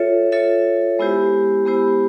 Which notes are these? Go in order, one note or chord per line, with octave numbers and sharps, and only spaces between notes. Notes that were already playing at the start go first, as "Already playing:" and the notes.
Already playing: F4 A4 C#5 E5
F4 A4 C#5 E5
G#3 B3 E4 G4 C5
G#3 B3 E4 G4 C5